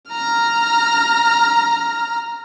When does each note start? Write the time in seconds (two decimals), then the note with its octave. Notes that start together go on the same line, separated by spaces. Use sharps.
0.11 A#5 F6